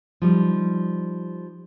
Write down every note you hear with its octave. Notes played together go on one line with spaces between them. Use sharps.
F3 G3 D#4